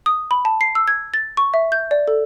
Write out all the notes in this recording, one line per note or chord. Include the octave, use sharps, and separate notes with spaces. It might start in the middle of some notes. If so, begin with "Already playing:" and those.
D#6
B5
A5
C7
E6
G#6
A6
C#6
E5
G6
D5
A4